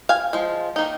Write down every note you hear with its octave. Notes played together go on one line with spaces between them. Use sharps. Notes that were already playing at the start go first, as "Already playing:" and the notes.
F5 G#5
F3 G#3
D#3 A#3 D#4